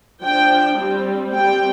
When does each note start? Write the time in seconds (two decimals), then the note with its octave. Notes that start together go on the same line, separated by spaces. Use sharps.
0.22 F3 D4 G5
0.78 G3 C4
1.33 G3 C4 G5